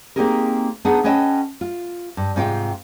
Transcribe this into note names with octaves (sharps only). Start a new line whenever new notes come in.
A#3 C4 D#4 G4 G#4 A#4
B3 D4 D#4 G#4 F#5
C#4 B4 C#5 D#5 G5 A5
F4
G2
G#2 C3 F4 F5 G5